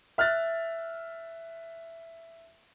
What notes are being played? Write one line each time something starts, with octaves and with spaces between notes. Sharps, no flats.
E5 F6 F#6 A6